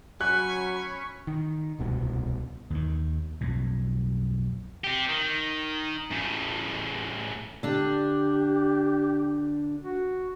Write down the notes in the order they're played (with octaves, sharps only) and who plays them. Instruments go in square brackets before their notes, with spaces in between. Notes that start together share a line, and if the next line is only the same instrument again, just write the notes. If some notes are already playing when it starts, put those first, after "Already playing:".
[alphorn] F#3 [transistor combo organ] C#4 B5 C#6 [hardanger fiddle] G#5 [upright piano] F#6
[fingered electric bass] D#3
D1 C2 B2
[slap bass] D#2 D#3
B1 F2 A2
[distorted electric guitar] C4 G4
D#3
A2 C#3
[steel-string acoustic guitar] D3 D4 [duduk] G4
[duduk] F#4